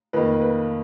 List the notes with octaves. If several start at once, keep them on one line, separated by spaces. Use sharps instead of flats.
F2 D#3 A#3 B4
B4